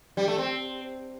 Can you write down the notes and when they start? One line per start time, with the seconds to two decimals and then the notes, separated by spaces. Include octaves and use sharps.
0.17 G3
0.28 A3
0.38 C4